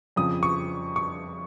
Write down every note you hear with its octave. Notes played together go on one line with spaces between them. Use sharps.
F2 C#3 F3 D#6
C#6
C#6